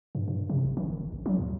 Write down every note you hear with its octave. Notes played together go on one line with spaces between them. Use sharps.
G2
G2
C3
G#1
D#3
F#1
A1
F#3
D#2